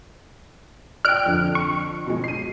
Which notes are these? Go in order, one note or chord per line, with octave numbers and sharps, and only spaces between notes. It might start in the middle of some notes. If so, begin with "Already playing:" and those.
D5 G5 F6 F#6 D7
F2 D3
C#6
B2 G#3
C7 D#7